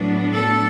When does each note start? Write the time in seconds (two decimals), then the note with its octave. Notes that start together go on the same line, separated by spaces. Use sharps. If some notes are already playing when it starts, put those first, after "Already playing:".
Already playing: A2 F#3 B3 D4
0.32 A4